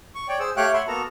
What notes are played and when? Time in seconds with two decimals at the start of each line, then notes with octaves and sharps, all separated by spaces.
0.15 C#6
0.28 C#5 D5 G5
0.40 G#4 C5 E6
0.57 A3 G4 C#5 F5 G5 F#6
0.73 C#5 E5 F#5 B5 C6
0.87 A#3 B3 F#4 A4 A5 A#5